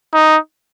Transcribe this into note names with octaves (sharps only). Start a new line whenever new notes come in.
D#4